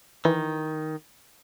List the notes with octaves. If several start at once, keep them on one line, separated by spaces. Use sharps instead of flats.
D#3 E3